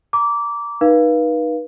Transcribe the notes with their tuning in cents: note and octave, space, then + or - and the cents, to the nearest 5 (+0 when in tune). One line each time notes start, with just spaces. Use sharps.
A#5 +0 D6 -15
D#4 -10 B4 -30 F5 -15